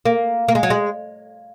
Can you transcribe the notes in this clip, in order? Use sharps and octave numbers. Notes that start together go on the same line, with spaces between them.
A#3
A#3
G#3
F#3
G#3